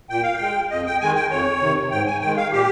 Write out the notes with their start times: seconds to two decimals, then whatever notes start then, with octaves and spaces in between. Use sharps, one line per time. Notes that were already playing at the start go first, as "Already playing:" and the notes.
0.10 A#2 G5
0.23 F5
0.36 G#3 G5
0.71 F2 D#5
0.86 G5
1.01 D#3 G#3 G#5
1.16 G5
1.31 F2 C#5
1.61 C3 D#3
1.91 G#2 G5
2.07 G#5
2.21 D#3 G#3 G5
2.37 F5
2.52 A#2 G4